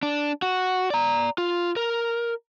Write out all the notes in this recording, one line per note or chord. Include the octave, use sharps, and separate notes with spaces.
D4
F#4
D5 A#5
F4
A#4